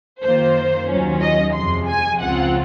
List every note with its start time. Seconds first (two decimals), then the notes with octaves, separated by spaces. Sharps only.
0.23 F#2 D#3 A#3 F4 C5
0.89 D#2 D#3 F#3 C#4 F4
1.22 D#5
1.55 F2 C3 F3 G#3 C6
1.88 G#5
2.21 C#2 C#3 F3 C4 F4 F#5